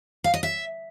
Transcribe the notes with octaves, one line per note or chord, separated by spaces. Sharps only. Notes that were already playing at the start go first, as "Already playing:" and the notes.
F5
D#5
E5